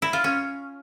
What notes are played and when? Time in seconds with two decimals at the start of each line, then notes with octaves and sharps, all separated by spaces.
0.02 E4
0.13 F4
0.24 C#4